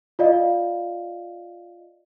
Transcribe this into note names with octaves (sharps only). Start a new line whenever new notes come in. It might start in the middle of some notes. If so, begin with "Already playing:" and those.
F4 D5 D#5 F5